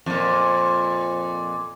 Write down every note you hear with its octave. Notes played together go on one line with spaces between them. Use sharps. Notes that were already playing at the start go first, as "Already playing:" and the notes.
F2 A#2